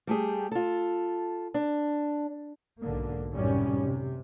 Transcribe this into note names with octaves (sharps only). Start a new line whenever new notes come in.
G3 A3 G4 G#4
F4 A4
D4
B1 G#2 D3 A#3
F#2 A2 C3 D#3 G3 C#4
C3